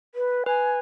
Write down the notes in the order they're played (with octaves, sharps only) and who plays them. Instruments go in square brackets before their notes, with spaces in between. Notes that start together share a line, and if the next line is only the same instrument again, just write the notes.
[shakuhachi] B4
[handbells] B4 [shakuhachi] G#5